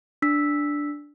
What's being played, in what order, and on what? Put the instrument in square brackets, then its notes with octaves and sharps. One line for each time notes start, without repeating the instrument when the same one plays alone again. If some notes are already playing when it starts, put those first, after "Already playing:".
[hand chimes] D4 E6 B6